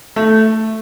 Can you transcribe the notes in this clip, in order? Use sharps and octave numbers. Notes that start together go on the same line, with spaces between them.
A3